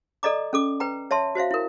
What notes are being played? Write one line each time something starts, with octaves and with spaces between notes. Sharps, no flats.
A4 D5 D#5 A#5 D6
C#4 A4 D6
B4 G5 A#5
C#5 E5 A5 C6
F#4 C5 E5 F5
E4 A#4